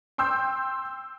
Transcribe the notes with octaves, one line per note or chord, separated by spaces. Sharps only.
G5 C6 E6 G6